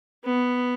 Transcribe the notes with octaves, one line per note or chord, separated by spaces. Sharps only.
B3